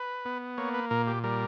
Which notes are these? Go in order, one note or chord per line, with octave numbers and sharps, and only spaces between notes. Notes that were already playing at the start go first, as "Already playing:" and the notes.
Already playing: B4
B3
A#3 C#5
B4
A#2 A#4
G4
G3 A#4